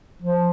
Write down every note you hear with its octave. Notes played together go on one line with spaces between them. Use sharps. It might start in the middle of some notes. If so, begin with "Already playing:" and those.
F3